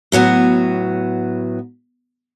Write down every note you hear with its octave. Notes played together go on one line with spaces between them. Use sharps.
A2 F#3 B3 F#4